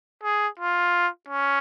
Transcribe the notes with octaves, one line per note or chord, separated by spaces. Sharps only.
G#4
F4
C#4